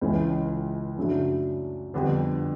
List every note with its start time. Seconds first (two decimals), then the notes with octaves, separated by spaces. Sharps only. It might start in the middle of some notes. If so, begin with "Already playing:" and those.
0.01 C#2 C#3 E3
0.97 F#2 C#3 F#3 A3 D4
1.94 F2 D3 G3 B3 D4